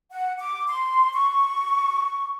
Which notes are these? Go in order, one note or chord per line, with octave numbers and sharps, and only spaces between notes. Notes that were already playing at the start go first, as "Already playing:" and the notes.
F#5
D6
C6
C#6